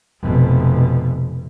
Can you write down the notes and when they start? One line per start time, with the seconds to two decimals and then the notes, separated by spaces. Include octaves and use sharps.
0.22 F1 B2